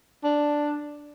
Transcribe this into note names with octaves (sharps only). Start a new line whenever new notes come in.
D4